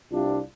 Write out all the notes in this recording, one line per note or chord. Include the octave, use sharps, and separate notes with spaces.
C2 C3 G3 D4 F4